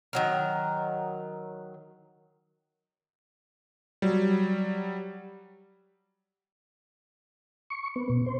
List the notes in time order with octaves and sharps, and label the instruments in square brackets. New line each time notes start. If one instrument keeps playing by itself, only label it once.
[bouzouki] D#3 F#3 A#4
[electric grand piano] F#3 G3
[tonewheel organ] C#6
B3
B2
C5